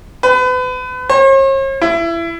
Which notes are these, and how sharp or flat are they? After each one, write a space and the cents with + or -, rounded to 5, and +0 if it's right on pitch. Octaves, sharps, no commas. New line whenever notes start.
B4 +35
C#5 -45
E4 +25